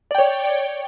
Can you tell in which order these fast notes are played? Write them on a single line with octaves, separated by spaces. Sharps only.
D5 G5 C#5